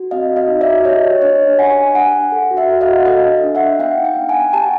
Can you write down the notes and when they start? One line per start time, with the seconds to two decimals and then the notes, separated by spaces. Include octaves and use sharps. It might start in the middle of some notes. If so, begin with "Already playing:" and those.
Already playing: F#4
0.11 C4 D#5 F5
0.30 F#4
0.36 D#5 F5
0.48 D#4
0.61 D5 E5
0.66 F#4
0.85 G4 C#5 D#5
1.03 G4
1.22 D4 C#5 D#5
1.41 D4
1.58 G4 F#5 G#5
1.77 D4
1.95 D4 F#5 G#5
2.14 D4
2.32 A4
2.51 F#4
2.57 E5 F#5
2.70 F#4
2.81 D#5 F5
2.88 F#4
3.06 A4 D#5 F5
3.25 D4
3.44 D4
3.55 E5 F#5
3.61 D4
3.79 B3 F5 G5
3.98 D#4
4.04 F5 G5
4.17 B3
4.29 F#5 G#5
4.35 B3
4.53 G4 G5 A5